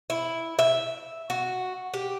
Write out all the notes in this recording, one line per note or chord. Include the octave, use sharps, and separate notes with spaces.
E4
E5
F#4
G4